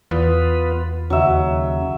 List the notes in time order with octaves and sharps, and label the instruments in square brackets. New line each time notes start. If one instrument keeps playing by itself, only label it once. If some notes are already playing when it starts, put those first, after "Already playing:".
[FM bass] E2 [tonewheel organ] B3 F4 B4
[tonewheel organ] D#2 C#3 [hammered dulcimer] F#3 E5